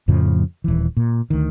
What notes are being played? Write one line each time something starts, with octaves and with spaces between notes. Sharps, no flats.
F2 A2 C#3 F3
D#1 E3
A#2
D2 D#3